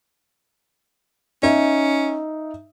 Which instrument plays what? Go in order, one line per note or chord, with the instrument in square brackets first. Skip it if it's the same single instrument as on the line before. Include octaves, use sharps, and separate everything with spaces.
[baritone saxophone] C#4 [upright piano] D#4 E5